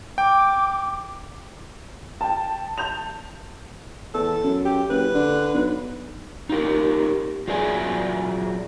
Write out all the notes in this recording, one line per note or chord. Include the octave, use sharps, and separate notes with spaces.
G5 D6
G5 A5
A5 G6 F7
E2 A4
F#2
G4
F#1 B4
D3
B1
D#4 F4 G4 A#4
F#3 F4 G#4 D5 E5 G#5